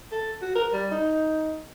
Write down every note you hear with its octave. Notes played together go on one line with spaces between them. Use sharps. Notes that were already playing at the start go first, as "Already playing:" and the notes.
A4
F#4
A#4
G3
D#4